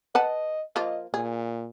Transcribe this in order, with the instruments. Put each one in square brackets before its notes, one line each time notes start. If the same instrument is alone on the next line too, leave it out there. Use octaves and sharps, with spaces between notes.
[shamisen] B4 F#5 A5 [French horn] D#5
[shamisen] F3 A#3 F4 [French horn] D#5
[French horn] A#2 [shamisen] G#4